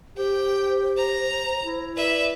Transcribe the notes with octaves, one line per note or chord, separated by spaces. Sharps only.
G4 C5 G5
A#5
E4
B4 D5 E5